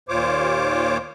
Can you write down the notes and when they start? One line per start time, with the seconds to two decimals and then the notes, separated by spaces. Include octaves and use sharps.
0.09 D#2 A#2 F4 C5 C#5 D6